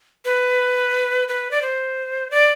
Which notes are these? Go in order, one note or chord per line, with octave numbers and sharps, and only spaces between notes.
B4
B4
D5
C5
D5